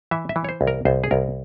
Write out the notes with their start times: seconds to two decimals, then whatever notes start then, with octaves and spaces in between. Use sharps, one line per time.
0.11 E3 E5
0.29 E5
0.36 E3
0.44 C#5
0.49 C5
0.61 C2
0.67 A#4
0.85 C2 C5
1.04 G#4
1.11 C2 A#4